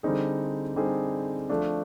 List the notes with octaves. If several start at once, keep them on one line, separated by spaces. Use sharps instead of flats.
D3 G3 C4 D#4 G#4
D3 G3 C4 D#4 G#4
F3 A3 D4